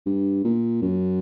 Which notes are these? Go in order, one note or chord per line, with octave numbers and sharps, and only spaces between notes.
G2
A#2
F#2